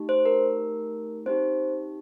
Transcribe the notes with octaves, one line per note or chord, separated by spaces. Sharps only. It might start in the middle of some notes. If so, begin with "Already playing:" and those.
Already playing: A3 D#4 G4
C5
A#4
C4 D#4 G4 C5